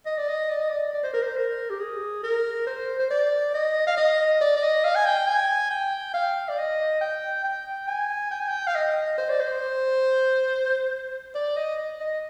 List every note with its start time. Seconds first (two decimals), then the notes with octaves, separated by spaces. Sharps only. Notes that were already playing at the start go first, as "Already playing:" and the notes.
0.06 D#5
0.18 D5
0.29 D#5
0.50 D5
0.60 D#5
0.69 D5
0.93 D5
1.03 C5
1.13 A#4
1.23 C5
1.37 A#4
1.70 G4
1.80 G#4
2.23 A#4
2.67 C5
2.99 C5
3.10 D5
3.54 D#5
3.87 F5
3.97 D#5
4.41 D5
4.56 D5
4.63 D#5
4.84 F5
4.95 G#5
5.06 G5
5.28 G#5
5.71 G5
6.14 F5
6.49 D5
6.58 D#5
7.01 G5
7.44 G5
7.88 G#5
8.31 G5
8.40 G#5
8.48 G5
8.67 F5
8.75 D#5
9.18 C5
9.30 D5
9.40 C5
11.35 D5
11.57 D#5
12.01 D#5